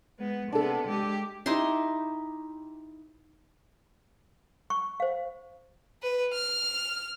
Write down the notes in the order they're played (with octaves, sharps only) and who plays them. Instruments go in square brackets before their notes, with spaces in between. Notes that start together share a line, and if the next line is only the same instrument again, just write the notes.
[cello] G#3 B3
[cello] C3 B3 [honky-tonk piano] D4 A4
[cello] G#3 G4
[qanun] D#4 E4 G4 C6
[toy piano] C#6
C5 F5
[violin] B4
F6